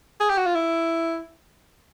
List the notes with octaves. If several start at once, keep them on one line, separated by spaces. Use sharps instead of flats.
G#4
G4
F#4
F4
E4